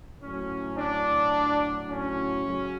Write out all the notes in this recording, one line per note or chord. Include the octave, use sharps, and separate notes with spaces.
A2 F#3 C#4
D4
C#4
C#3 F#3